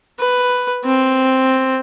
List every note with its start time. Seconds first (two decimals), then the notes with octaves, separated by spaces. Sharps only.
0.19 B4
0.84 C4